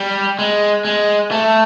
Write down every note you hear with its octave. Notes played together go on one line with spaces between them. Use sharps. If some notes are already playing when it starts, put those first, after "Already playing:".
Already playing: G3
G#3
G#3
A3